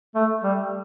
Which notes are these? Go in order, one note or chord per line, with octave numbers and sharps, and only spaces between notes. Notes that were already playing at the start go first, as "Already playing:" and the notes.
A3
G3